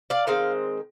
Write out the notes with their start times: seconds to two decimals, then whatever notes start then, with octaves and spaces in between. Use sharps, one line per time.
0.10 D5 F5
0.27 D#3 G#3 C4 F5